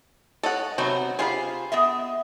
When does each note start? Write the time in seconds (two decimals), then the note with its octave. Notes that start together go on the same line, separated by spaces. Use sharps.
0.43 A4 C#5 D#5 F#5
0.78 C3 F#3 B3 C4 D#4 F#4
1.19 F4 G4 G#4 C5 F5 B5
1.72 B3 D#5 E5